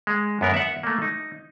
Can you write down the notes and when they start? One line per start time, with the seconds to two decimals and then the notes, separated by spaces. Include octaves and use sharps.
0.07 G#3
0.41 F#2 B3 A#4 F#5
0.54 E5 F#5
0.83 A3 A#3
1.02 D#4